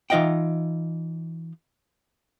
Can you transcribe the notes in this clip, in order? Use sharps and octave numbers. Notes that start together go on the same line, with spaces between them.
E3 D#4 F4 D#5 F#5 G5